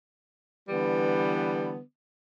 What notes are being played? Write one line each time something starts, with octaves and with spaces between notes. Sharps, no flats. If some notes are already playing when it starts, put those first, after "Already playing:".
D3 E3 G3 B3 B4